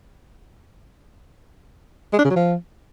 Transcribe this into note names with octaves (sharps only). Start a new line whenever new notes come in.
G#3
D4
C#3
F#3
F3